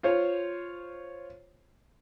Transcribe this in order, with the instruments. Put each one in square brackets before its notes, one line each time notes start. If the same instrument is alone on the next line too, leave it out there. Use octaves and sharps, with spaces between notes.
[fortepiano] F4 C5 C#5